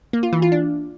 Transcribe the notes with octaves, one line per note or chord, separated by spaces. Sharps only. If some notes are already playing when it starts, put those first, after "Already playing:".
A#3
F4
E3
F4
D4